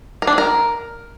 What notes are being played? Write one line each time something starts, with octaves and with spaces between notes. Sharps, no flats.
A#4
D4
C4
A#4